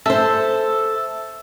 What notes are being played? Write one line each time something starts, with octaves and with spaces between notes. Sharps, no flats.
A4 C5 E5